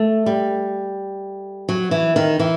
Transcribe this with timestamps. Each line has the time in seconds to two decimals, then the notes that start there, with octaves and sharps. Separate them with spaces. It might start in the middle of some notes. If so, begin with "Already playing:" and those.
Already playing: A3
0.26 G3
1.69 F#3
1.91 E3
2.16 D#3
2.39 E3